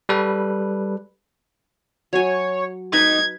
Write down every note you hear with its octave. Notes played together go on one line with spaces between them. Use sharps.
G3 A4 B4
F#3 C#5 G#5
D#4 B4 G#6